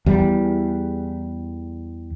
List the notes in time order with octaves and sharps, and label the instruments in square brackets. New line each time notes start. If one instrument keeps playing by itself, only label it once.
[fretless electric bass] E2 G3